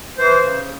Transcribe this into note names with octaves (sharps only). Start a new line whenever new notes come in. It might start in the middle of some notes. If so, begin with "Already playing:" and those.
E3 C5
C#3